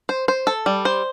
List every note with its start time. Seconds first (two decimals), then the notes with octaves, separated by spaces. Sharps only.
0.09 C5
0.28 C5
0.47 A4
0.66 G3
0.85 C5